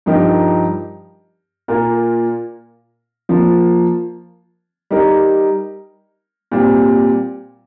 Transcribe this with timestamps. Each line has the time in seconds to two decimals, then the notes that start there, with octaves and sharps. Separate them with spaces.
0.06 G2 F3 D#4 G4 A#4
1.68 A#2 A#3 F4 A#4
3.29 F3 A#3 F4
4.91 G3 D#4 A#4
6.51 A#2 G3 C4